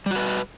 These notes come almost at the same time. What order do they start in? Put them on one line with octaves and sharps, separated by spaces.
G3 F#4 B4